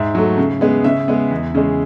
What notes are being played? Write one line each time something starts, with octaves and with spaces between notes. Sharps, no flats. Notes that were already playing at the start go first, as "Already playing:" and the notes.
Already playing: G#2 E5
F#3 A3
C#3
G#3 B3
C#3 E5
G#3 B3
E2
C#3 G#3